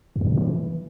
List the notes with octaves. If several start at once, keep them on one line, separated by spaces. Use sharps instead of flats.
F2
A2
G2
G#2
E3